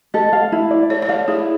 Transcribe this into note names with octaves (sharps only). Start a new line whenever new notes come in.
A4 D#5
F5
E4
D5
A4 C#5
C#5
D5 F5
E4 G#4